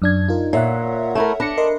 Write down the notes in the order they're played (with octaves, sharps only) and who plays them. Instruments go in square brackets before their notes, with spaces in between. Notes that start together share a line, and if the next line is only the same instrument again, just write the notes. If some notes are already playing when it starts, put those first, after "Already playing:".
[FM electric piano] F#2 D4 G#6
D#4 F4 A#4
[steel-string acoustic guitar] A#2 [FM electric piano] C#5 E5 F#5
[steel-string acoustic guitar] A3 E4 A#4
[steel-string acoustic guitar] D4 [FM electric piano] B5 A#6 C#7
[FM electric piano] A#4 D#5 C6